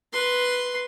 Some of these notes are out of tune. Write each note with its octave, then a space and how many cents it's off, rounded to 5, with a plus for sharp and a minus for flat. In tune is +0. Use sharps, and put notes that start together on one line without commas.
B4 +0 C6 +0